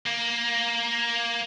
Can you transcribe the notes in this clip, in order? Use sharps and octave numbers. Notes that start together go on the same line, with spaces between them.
A#3